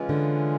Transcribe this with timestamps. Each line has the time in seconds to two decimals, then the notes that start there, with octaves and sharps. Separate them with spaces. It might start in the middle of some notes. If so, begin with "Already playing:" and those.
Already playing: C#3 E3 G#3 C#4 F4
0.09 D3